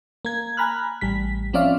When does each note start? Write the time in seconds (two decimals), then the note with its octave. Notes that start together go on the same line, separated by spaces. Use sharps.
0.25 A#3 G#6
0.57 G#5 A#5 B5 F6 F#6
1.01 A1 G3 B6
1.53 F3 C4 C#4 D5 E5 F5